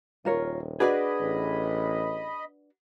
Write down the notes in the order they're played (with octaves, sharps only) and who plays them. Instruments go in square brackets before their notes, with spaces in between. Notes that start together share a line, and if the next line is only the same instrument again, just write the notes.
[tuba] D#1 [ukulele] F4 A#4 C#5
[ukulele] D4 F#4 B4 [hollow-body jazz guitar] G#4 D5 [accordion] D#5 B5
[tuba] A1